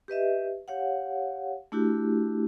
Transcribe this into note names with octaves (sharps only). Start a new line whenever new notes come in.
G4 B4 D#5 E5
G4 C#5 F5 F#5
A3 D4 E4 F#4 G4